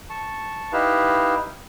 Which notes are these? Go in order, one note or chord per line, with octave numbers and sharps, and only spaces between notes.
A5 C#6
D#4 E4 G4 B4 F5